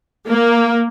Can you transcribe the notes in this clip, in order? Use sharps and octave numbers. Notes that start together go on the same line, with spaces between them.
A#3